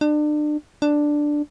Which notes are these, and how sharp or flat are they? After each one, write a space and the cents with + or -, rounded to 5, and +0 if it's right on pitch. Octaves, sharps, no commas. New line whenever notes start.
D4 +35
D4 +5